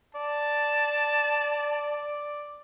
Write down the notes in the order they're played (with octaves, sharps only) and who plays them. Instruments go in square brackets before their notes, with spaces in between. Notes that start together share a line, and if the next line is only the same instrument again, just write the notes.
[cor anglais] D5 [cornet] A5